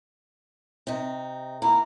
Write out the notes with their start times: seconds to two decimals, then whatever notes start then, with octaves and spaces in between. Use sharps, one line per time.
0.87 C3 D#4
1.62 A#3 E4 A#5